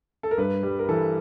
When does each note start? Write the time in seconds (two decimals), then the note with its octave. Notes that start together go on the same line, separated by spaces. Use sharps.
0.23 A4
0.31 A#4
0.37 G2 B4
0.63 G3
0.79 A#4
0.88 E3 A4